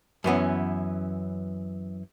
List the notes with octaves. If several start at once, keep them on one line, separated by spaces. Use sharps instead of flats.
F#2 E3 B3 C#4